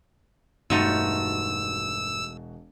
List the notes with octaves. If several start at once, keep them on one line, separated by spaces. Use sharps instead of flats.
E1 G2 A3 D#4 F4 F#4 E6 F7